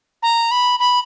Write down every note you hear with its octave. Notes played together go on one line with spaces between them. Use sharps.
A#5
B5
B5